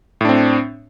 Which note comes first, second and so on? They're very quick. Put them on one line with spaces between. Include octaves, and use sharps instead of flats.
A2 D4 C4